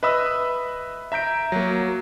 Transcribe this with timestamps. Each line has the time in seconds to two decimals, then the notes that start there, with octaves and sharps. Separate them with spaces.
0.03 B4 D#5 E5 B5 D#6 E6
1.12 E5 A#5 G6 D7
1.52 F#3 A#3